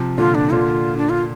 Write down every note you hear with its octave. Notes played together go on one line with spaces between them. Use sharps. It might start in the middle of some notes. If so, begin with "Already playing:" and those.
Already playing: C3 F3
A#2 D3 F4
D4
A#2 D3 F4
D4
F4